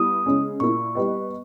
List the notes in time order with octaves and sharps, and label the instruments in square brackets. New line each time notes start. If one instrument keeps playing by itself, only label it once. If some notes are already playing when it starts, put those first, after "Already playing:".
Already playing: [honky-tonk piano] G3 B3 E4 [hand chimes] D#6
[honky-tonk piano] C#3 G#3 C#4 G#4
[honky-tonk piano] A#2 A#3 E4 [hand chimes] C#6
[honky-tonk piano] G3 B3 G4 B4 D#5